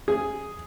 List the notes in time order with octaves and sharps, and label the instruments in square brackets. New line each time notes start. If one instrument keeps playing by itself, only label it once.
[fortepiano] G#4